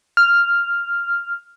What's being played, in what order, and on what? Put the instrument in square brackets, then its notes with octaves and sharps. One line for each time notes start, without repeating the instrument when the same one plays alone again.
[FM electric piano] F6